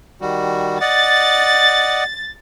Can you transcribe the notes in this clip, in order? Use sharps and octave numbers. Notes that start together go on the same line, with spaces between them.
D#3 G3 F#4
D5 D#5 F#5 A6